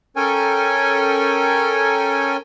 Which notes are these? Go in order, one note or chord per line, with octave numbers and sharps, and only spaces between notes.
C#4 A4 A#4 C#5 G5 G#5